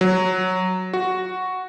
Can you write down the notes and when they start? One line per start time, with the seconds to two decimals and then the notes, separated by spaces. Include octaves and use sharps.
0.01 F#3
0.93 F#4